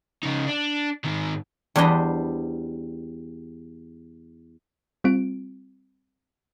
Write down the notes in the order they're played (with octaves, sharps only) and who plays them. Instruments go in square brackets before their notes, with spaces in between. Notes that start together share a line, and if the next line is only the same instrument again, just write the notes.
[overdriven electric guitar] C#3 D#4
D4
G#2 D#3
[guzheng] E2 G3 D4 B4 C5 D#5
[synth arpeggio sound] G3 C4 F4 D7